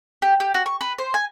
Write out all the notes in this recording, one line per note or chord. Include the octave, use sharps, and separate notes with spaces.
G4
G4
F#4
C#6
B4
C5
G#5